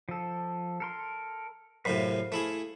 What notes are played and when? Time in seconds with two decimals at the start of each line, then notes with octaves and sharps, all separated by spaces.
0.09 F3 A4
0.80 A4 A#4 C6
1.85 F#2 A2 C3 C5 F5 B5
2.32 A3 E4 G#4